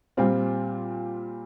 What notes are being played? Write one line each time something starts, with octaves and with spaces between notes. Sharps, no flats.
A#2 G3 C4 F4